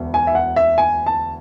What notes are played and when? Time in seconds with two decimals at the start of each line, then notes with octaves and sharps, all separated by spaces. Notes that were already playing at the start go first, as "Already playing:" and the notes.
Already playing: E1 D2
0.14 G#5
0.27 E5
0.35 F#5
0.56 E5
0.78 G#5
1.06 A5